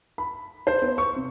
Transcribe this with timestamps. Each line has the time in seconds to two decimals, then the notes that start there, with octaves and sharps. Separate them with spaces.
0.18 B5
0.67 C5
0.82 B3
0.98 C#6
1.16 C3